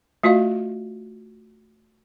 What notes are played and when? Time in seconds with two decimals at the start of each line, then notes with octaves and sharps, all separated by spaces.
0.23 A3 F4 F#4 D#5 F5